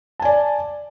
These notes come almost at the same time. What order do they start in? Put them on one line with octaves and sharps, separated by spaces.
A5 G#5 D5